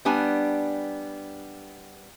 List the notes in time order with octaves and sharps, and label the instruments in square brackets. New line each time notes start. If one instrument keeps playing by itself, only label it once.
[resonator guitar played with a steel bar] G3 B3 D4 G#5